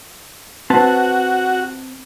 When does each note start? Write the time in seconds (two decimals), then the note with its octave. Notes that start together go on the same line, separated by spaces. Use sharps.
0.70 C4 F#4 B4 A5